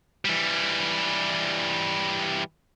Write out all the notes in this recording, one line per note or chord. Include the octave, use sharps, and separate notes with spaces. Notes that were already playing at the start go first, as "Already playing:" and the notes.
E3 G3